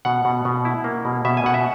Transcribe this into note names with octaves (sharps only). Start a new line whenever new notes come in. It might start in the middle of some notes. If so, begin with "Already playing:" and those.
B2 F#5
B2
B2
E4
A#3
B2
B2 E5
G#5
B2 F#5
E5